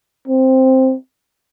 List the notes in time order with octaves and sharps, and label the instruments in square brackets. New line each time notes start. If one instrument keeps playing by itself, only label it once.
[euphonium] C4